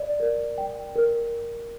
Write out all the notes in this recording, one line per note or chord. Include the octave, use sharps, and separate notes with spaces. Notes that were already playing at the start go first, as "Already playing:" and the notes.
Already playing: D5
A#4
G5
A#4